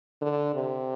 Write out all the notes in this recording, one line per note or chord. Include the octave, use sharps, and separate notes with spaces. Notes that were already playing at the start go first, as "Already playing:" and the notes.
D3
C3